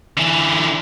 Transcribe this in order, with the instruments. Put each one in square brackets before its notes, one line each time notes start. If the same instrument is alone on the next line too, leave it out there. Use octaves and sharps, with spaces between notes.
[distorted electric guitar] D3 E3